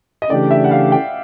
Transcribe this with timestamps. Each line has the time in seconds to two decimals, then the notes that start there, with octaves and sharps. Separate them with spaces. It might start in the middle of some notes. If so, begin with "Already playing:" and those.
0.22 D#5
0.30 C#3 E3 A3 D4 G4 D5
0.51 E5
0.64 F#5
0.71 F5
0.92 G5